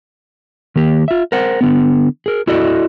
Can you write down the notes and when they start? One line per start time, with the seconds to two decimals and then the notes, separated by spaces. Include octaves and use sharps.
0.76 D#3 A#3 G4
1.08 F4 E5
1.32 A#4 C5 F#5
1.61 D3 B3
2.26 G#4 A#4
2.47 E4 F#4 A4 D5 D#5